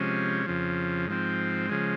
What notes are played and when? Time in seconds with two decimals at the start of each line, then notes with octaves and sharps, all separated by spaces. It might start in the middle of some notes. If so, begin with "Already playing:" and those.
Already playing: C3 F3 G#3 C#4
0.46 F2 C#3 F3
1.08 G#2 F3 C4
1.69 C#3 F3 G#3